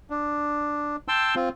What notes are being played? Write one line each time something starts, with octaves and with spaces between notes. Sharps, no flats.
D4
G5 A5 C6 E6
C4 F4